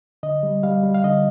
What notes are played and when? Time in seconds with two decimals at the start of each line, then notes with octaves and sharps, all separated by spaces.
0.23 D3 D#5
0.43 G3
0.63 G3 F5
0.83 G3
0.95 F5
1.04 D3 D#5